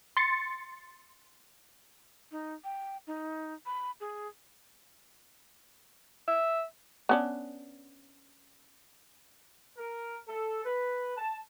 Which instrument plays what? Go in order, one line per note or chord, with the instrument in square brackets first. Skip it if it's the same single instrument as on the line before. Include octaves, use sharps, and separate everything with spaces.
[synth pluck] C6 A6 C#7
[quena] D#4
G5
D#4
B5
G#4
[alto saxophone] E5
[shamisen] B3 C#4 D4
[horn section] A#4
A4
B4
A5